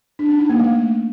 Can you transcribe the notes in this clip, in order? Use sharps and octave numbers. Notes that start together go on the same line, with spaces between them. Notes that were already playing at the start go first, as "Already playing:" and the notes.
D4
C#4
D#4
A#3
A3